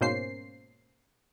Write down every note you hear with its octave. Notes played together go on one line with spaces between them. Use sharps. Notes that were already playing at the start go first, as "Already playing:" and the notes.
G#2 B2 A#3 C#4 C5 C7